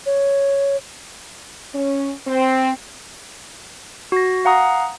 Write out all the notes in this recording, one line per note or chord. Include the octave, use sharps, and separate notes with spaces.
C#5
C#4
C4
F#4 A#6
F5 F#5 A#5 D#6